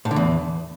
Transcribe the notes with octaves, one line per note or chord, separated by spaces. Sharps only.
A2
D3
E2